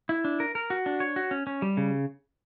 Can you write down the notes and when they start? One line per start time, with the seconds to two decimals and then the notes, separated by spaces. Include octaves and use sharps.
0.09 E4
0.25 D4
0.40 A#4
0.55 A#4
0.70 F#4
0.86 D4
1.00 C#5
1.16 F#4
1.31 C#4
1.47 C#4
1.62 G3
1.77 C#3